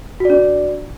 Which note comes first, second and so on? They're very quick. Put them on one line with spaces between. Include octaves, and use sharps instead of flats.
F#4 D5 D4